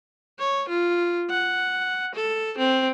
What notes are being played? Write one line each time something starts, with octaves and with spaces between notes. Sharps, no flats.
C#5
F4
F#5
A4
C4